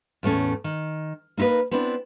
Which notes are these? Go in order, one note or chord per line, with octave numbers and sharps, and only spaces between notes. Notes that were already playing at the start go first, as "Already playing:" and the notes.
E2 A2 A3 C#4
D#3
A#3 D#4 E4 A#4 B4
B3 C4 D4 E4 D5